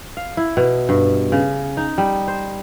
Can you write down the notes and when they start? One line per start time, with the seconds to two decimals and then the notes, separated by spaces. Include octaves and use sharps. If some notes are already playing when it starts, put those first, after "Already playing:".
0.17 F5
0.37 E4
0.57 B2
0.89 G2
1.32 C#3
1.77 D#4
1.98 G3
2.28 C5